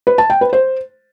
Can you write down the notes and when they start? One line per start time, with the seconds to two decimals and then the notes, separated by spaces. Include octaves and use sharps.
0.07 B4
0.18 A5
0.30 G5
0.41 B4
0.53 C5